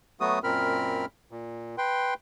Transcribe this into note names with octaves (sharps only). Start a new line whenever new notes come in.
F#3 A3 B3 F#4 D#6
F#2 A#2 C4 A#4 B5 F6
A#2
B4 G5 C6